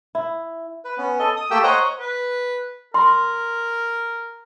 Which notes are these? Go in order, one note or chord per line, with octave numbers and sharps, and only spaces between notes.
E4
B4
B3 C#4
A4 D#5
D#6
A3 A#3 G4 G5 E6
C5 C#5 D#5 F#5 A#5
B4
A#4 C6